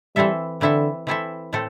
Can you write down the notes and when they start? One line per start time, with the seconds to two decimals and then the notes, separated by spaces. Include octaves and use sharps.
0.16 E3 G3 C4 E4 A4 E5
0.61 D3 E3 C4 E4 A4 E5
1.07 E3 C4 E4 A4 E5
1.53 A2 A3 C4 A4